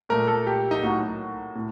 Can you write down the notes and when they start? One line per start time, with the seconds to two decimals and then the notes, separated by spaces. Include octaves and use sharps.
0.09 A#2 A3 A#4
0.27 A4
0.47 G4
0.71 D#4
0.83 A2 F#3 A#3 F#4
1.55 A2